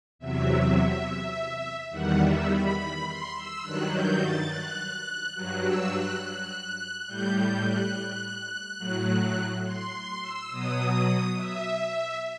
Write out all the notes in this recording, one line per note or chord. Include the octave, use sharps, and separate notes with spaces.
E2 C3 F#3 E5
E2 D#3 G3 F#5
E5
B5
B5
C6
E6
G2 D#3 F#3 F#6
G6
A6
F#6
G2 F#3 F#6
E6
F#6
F#6
A2 G3 G6
G6
F#6
A2 F#3
C6
C6
E6
B2 F#3 D#6
E5